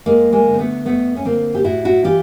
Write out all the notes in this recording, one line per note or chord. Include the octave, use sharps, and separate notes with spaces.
F2 G#3 A#3
G#3 A#3
D3
C4
A3 B3
F2 A3 B3
C#4
D3 A#3 C4
G4
A2 E4 F#4
E4 F#4
E3 F4 G4